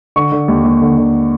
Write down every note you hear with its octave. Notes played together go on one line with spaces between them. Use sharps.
D3 C#6
D3
D#2
D#2
D3
D3